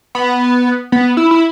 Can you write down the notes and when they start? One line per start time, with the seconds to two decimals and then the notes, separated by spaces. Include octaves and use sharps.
0.15 B3
0.92 B3
1.17 E4
1.31 E4